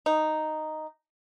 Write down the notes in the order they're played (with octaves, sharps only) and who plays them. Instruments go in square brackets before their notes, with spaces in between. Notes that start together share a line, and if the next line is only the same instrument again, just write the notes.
[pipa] D#4